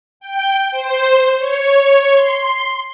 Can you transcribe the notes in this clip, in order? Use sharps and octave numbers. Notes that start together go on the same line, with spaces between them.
G5
C5
C#5
C6